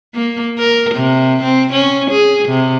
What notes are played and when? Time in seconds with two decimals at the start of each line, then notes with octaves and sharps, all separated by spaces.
0.15 A#3
0.58 A#4
0.95 C3
1.43 C4
1.73 C#4
2.11 G#4
2.48 C3